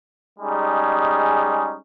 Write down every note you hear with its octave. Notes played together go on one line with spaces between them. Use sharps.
G3 G#3 C#4 D#4 G#4